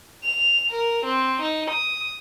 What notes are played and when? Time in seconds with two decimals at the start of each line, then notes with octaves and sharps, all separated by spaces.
0.24 F7
0.71 A#4
1.06 C4
1.42 D#4
1.71 D#6